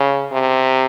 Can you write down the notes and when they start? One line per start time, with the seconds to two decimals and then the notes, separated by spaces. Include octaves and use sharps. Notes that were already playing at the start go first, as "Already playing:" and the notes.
Already playing: C#3
0.33 C3